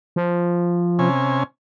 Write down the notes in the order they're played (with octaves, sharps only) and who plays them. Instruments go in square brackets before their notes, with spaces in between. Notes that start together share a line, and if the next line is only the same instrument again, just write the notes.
[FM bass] F3
[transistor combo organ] C3 C#4 G#5